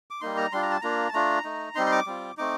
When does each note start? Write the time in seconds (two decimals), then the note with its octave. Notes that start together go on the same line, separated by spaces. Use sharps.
0.11 D6
0.21 G3 A#3 D#4 C6
0.37 A#5
0.52 G3 D4 F4 C6
0.63 A#5
0.71 A5
0.81 A#3 D4 F4 A#5
1.09 A5
1.13 A3 D4 F4 A#5
1.45 A3 D#4
1.75 G3 C4 D#4 C6
1.86 C6
1.92 D6
2.07 G3 C4 F4
2.37 A3 C4 D#4 D6